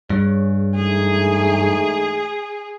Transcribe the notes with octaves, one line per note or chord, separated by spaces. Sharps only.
G2 G#4 C#5
G#2 E3 A3 G#4